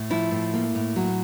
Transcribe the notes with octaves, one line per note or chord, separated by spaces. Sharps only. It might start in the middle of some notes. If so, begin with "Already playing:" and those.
Already playing: A2
F3 E4
A2
A#3
A2
F#3